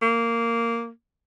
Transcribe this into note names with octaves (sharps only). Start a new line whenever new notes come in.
A#3